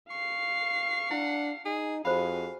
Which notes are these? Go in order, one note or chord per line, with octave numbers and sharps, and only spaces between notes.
F5 C#6 C7
D4 E4 F#5
D#4 G#4
F2 F#4 G#4 C5 F5 B5